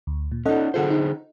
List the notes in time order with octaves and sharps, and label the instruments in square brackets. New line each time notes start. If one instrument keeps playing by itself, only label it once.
[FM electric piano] D2
A#2
[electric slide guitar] C#4 D#4 [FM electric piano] A4 D#5 F#5
[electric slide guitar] D3 G#4 C5 [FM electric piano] F4 A4 F#5
[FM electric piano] D#4